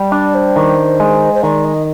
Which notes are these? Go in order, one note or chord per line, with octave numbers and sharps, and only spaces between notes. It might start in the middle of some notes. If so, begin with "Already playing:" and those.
Already playing: G3
D4 D5
C5
D#3
G#3
C5
D#3 D5
D#5